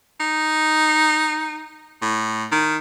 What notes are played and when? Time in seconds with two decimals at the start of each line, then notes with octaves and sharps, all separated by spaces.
0.20 D#4
2.02 A2
2.52 D#3